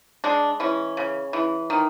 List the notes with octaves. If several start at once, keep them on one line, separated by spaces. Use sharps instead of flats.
G#3 D4
E3 C#4
C#3
E3
D#3